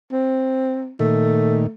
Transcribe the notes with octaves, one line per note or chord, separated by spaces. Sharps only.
C4
A#2 D#3 A3